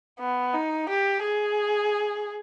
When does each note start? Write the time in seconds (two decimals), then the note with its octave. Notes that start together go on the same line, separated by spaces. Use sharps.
0.20 B3
0.54 D#4
0.89 G4
1.23 G#4